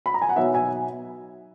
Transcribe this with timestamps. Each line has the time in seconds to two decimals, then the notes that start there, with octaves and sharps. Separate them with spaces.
0.06 B5
0.14 A#5
0.22 G#5
0.29 F#5
0.36 B2 F#3 B3 D#4 C#5 E5
0.54 E5 G#5